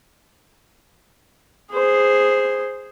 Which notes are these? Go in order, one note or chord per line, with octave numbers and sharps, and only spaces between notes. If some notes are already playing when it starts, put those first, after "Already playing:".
G#4 C5